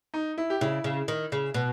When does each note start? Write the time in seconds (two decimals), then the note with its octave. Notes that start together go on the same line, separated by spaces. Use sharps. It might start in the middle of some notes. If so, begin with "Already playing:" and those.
0.14 D#4
0.38 E4
0.50 G4
0.61 C#3 E4
0.84 C#3
1.08 D#3
1.32 C#3
1.54 B2